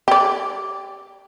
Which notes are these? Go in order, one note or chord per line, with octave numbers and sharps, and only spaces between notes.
G4 D5